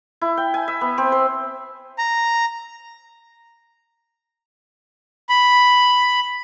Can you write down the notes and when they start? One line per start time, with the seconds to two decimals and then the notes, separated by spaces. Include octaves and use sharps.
0.21 E4
0.37 G5
0.54 G#5
0.68 E5
0.81 B3
0.98 C4
1.12 C5
1.98 A#5
5.29 B5